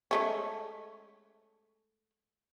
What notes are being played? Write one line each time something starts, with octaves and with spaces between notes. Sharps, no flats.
G#3 A3 C#4